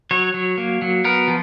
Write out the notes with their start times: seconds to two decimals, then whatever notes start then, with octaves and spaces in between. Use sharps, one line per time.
0.11 F#3 C#5
0.34 F#3
0.58 A#3
0.82 F#3
1.04 B3 A#4
1.28 F3